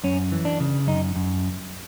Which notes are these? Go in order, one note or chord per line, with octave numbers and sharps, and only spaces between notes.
F#2 C#4
E3
D4
C#3
F#2 D#4
F#2